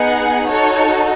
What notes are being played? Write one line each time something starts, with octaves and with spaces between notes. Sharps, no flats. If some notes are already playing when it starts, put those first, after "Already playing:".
Already playing: B3 D#4 G#4 F#5
D#4 F#4 A4 C#5